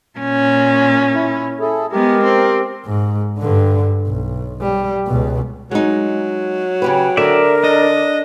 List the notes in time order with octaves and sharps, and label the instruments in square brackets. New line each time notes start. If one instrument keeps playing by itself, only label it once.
[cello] A#2 C#4
[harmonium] E4
E4 G#4 A4
[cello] G#3 B3 [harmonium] G4 A#4
[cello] C4
[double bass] G#2
G2 D3
B1
G3
C#2 B2
[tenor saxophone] F#3 [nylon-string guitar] G#3 D#4
[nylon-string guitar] C#3 G4 B4 [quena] G5
[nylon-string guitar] D3 [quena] A#4 [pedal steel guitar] D5 E5
[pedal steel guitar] D4 [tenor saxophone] D#5